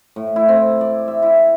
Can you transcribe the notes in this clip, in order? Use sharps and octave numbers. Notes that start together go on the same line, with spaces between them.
A2
E4
C4
D5
E5
E4